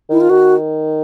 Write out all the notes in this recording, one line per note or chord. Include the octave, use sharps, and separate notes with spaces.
D#3 E4
F4
D#3 F#4